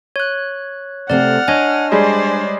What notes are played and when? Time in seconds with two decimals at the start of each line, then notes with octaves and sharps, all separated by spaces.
0.16 C#5 F#6
1.10 C3 A3 C4 D5 F#5 F6
1.48 D4 C#5 D#5 G#5
1.92 G3 G#3 G#4 C5 D5